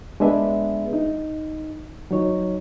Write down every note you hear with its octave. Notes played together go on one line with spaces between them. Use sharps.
G#3 B3 D4 G#4 B4 E5
D#4
F#3 D#4 C#5